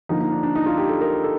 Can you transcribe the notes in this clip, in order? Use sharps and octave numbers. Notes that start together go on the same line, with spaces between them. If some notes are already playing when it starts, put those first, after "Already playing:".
D3 F3 A#3 D#4
D#4
D4
D4
D#4
F4
G4
A4
A#4
A4